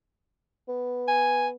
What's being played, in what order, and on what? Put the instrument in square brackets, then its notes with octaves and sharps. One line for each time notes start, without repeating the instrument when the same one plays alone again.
[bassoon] B3
[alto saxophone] G#5